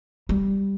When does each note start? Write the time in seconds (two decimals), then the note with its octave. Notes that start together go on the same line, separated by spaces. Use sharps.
0.29 G3